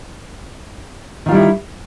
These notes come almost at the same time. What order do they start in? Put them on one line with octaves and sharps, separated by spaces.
D#3 F4 G3 E4